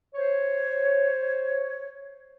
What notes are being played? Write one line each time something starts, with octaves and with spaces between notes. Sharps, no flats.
C5 C#5